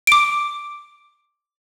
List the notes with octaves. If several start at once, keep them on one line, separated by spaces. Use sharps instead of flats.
D6 D7